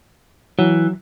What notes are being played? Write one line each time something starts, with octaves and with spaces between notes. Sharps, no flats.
E3 F#3